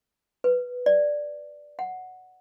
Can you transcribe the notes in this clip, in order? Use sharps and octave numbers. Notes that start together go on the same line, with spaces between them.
B4
D5
F#5